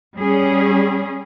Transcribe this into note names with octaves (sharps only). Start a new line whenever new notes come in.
G3 C#4 G#4